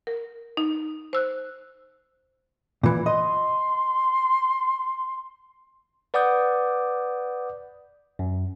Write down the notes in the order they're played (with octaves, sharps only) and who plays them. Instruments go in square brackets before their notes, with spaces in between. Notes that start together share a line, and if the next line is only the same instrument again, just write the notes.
[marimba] A#4
D#4
C5 E6 F#6
[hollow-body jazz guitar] A#2 E3
[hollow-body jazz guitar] D#5 [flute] C6
[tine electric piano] B4 D5 F#5 D6 D#6 G6
F#2